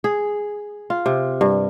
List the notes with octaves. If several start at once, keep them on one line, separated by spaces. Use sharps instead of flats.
G#4
F4
C3
G2